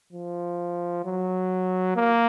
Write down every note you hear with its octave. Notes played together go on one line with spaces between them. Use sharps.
F3
F#3
A#3